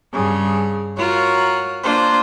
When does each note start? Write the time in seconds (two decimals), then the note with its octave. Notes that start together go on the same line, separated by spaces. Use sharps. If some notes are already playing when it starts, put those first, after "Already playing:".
0.13 G2 C#3 G#4
0.98 F4 F#4 A#4 C#5
1.83 A#3 D4 F4 C5